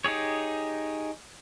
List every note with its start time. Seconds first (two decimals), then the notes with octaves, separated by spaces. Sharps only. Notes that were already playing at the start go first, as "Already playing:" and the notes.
0.04 D#4 G4 G#4 C#5